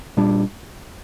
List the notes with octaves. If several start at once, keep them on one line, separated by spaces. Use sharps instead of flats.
A#2 G3 D4